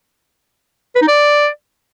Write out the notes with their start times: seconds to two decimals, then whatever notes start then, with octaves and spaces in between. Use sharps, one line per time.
0.95 B4
1.02 D#4
1.08 D5